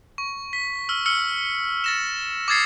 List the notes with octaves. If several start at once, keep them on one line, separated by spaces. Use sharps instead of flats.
C#6
B6
E6 F6
E6 F6 C#7
A6 A#6 E7
D6 D#6 G#6 A6 C7 C#7